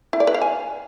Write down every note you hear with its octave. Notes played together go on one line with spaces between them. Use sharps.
E4
D5
B4
F5
G#5